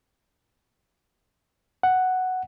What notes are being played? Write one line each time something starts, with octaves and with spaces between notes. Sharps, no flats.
F#5